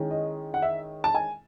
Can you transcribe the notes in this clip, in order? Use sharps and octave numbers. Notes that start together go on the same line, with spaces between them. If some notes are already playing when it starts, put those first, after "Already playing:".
Already playing: D#3 G#3 C#4 E4
D#5
F#5
E5
A5
G#5